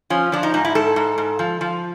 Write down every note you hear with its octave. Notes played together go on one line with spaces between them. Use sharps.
F3 C#4
F3 D4
D#4
G#2 D#4
E4
G#2 A4
G#2
G#2
F3
F3